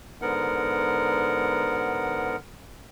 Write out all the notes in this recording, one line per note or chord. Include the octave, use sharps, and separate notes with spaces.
G#2 D3 B3 A#4 F#5